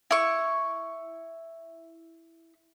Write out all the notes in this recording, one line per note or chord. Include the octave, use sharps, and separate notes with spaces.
E4 C#6